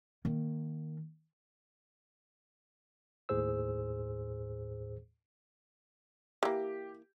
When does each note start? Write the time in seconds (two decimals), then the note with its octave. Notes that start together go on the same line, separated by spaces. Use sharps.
0.25 D#3 A#3
3.29 D#2 A2 G#4 C5 E6
6.43 E3 A#3 G4